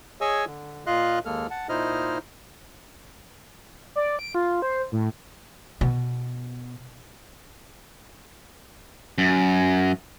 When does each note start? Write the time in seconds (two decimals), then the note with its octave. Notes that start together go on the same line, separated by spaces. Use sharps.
0.21 G#4 C#5 D#5 G#5 C#6 E6
0.47 D3
0.86 A#2 F4 D#5 F5 C6 F#6
1.25 D#2 G#3 A#3 A4 F6
1.50 F#5 A5
1.69 A#2 D#4 E4 C5 D#5 F6
3.96 D5
4.19 D7
4.35 F4
4.62 C5
4.92 A2
5.81 B2
9.18 F#2